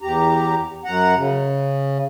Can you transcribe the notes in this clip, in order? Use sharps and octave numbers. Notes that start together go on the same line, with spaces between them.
E2 G4 A#5
F#2 F#5 A#5
C#3